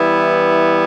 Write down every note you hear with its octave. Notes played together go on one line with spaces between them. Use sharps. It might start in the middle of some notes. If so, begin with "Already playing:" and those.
Already playing: E3 G3 B3 E4